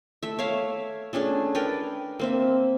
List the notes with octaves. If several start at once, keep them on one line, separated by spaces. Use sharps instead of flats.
A3 E5
C#5 E5 F5 D6
A3 C#4 D4 G#4
A#4 B4 D5 G5
A#3 C4 E5